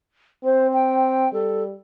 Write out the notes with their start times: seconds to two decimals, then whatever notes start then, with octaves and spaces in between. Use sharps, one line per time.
0.44 C4 C5
0.74 G5
1.33 G3 A4